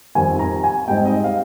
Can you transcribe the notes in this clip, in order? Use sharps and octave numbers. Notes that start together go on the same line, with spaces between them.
F2 D#3 G3 C4 G#5
A#5
G#5
G#2 G3 C4 D#4 G5
D#5
F5